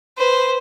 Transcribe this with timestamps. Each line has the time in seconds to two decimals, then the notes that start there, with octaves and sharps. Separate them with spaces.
0.18 B4 C5